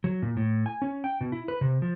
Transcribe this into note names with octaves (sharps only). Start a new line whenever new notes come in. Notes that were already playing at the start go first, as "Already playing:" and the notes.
F#3
A#2
A2
G#5
C#4
G5
B2
E4
B4
C3
F3